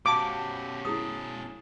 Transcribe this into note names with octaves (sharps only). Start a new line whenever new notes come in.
B2 C#4 F#4 G4 F5 A5 D6
E4 G#4 A5 D#6